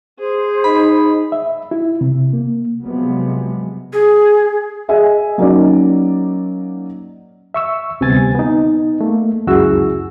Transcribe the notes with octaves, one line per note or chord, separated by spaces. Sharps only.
G#4 C5
D#4 B5
E5
E4
C3
A#3
C3 F3 F#3 G#3 B3
G#4
G#4 D#5 E5 G#5
F#3 A#3 C#4 D#4 D5
E5 C#6 E6
D2 C3 G3 B3 G#5 A6
B3 D#4
A3 A#3
C#2 F#2 E4 F#4 G#4 E6